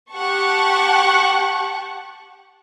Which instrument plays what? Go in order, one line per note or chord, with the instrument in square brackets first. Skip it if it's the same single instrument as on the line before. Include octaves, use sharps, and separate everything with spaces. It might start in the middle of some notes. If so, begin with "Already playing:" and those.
[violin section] G4 F#5 A5 C#6